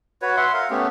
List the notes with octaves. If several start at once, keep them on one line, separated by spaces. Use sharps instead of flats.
F#4 B4 C#5
E5 F#5 C6
A#4 F5
A3 B3 C#4 G4